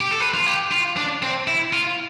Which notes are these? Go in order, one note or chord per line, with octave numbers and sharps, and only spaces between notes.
G4
A4
B4
F4
G4
F4
D4
C4
E4
F4